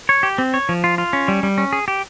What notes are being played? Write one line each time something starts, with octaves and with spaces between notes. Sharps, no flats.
C#5
G4
C4
C#5
F3
F4
F4
C#4
G3
G3
C#4
G#4
G4